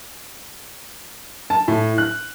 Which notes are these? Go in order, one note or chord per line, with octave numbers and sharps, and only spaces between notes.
A5
A2
F#6